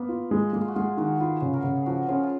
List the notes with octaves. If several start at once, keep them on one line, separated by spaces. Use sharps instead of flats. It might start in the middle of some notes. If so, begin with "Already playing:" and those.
Already playing: A#3 B3
F4
G#3
G#3 A#3
F4
F#4
G#3 F4 G#4
D#3 F#4 A#4
F4 G#4 B4
C#3
F#4 A#4
C#3
G#4
F3 F#4 A#4
A#4
C#4 F4 G#4
F4